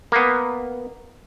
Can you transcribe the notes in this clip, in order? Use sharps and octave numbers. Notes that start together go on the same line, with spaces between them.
A#3 B3